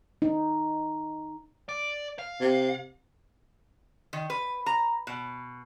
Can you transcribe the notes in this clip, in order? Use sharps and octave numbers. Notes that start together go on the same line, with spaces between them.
D#4
D5
F5
C3
D#3
B4
A#5
B2